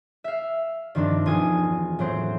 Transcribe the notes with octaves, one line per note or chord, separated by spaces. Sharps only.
E5 F5
G2 D#3 F3 C4 D4
E1 F4 G#5 D#6
A2 F#3 C4 C5